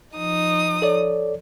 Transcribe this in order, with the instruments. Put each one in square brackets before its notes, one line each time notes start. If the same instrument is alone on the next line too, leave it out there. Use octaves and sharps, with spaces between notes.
[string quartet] F3 D#4 D#6
[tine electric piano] A4 C#5 D5